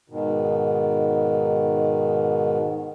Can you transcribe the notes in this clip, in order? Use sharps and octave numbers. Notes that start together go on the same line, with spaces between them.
G#2 B2 D#3